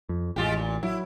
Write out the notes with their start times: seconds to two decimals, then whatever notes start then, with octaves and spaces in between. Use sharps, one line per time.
0.09 F2
0.36 A1 G#3 F4 G4
0.57 A#2
0.83 F#3 E4